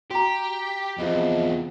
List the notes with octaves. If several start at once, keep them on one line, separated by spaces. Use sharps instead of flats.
F#4 G4 A#5
E2 C3 F3 B3 G#4 D#5